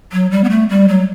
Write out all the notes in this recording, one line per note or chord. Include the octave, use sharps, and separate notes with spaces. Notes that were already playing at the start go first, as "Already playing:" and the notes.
F#3
G3
B3
A3
G3
F#3